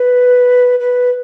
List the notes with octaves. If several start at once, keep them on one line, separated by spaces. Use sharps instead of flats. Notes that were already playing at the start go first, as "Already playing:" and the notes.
Already playing: B4
B4